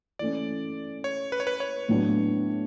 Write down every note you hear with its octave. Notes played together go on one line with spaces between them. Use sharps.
E3 A3 C#4 D5
C#5
B4
C#5
B4
C#5
A2 F#3 B3 D4